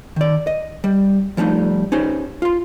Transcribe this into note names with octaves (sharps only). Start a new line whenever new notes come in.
D#3 D5
D#5
G3
F3 G3 A3 A#3 D#4
C#4 D#4 G4 C5
F4 C6